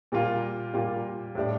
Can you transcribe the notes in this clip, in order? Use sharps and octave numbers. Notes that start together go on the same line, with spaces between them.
A#2 G3 A#3 F4
A#2 G3 A#3 F4
A2 G3 D4